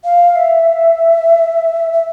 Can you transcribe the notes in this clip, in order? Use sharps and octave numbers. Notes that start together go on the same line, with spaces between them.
F5
E5
E5